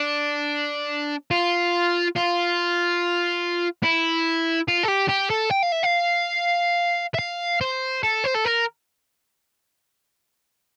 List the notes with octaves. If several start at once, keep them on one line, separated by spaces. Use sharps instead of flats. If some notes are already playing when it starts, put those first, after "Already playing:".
Already playing: D4
F4
F4
E4
F4
A4
G4
G4
A4
G5
F5
E5
F5
E5
F5
C5
A4
C5
A4
A#4